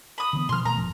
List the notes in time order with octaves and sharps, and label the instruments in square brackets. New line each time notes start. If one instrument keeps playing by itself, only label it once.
[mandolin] B5 D#6
[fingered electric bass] D3 E3 B3
[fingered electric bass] B2 D#3 F3 [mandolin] C6 F6
[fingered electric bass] B2 G#3 A3 [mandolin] A#5
[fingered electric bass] G1 E2 F3